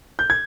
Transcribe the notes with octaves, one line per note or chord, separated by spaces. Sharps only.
G6
G#6